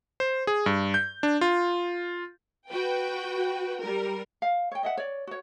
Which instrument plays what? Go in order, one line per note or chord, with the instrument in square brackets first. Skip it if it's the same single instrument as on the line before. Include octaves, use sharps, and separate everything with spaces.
[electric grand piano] C5
G#4
G2
G6
D4
F4
[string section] F#4 B4 G5
G3 A#4
[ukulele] F5
C#5 G5
D#5 E5 F#5
C#5 D5
F#4 C#5